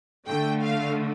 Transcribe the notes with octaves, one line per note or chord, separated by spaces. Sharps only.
D3 A3 G5
F5